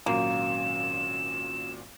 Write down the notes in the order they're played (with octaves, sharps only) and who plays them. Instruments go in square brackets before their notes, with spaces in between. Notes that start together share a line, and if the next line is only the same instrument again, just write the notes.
[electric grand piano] G#1 A#2 F#3 [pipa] A#3 [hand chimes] C#4 F4 F#4 [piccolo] E7